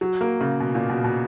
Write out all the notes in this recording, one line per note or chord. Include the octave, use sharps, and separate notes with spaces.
F#3
A#3
C#3
B2
A#2
B2
B2